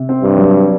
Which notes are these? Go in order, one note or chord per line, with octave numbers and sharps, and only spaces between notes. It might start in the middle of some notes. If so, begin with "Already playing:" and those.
Already playing: C3
C4
G2
F#3